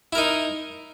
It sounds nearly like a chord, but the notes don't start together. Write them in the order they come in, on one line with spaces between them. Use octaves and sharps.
E4 A#4 D#4